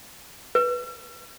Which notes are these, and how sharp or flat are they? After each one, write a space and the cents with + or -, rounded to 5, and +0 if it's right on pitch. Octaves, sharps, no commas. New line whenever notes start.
B4 -15